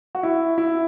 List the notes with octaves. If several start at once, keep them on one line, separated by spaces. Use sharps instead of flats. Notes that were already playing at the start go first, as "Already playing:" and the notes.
F#4
E4
E4